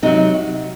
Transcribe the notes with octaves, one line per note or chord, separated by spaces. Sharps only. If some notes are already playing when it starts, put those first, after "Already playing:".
C3 F#3 D#4